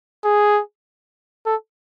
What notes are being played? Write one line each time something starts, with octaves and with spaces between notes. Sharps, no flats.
G#4
A4